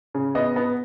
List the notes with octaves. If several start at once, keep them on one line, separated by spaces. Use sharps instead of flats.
C#3
B3 D#5
B3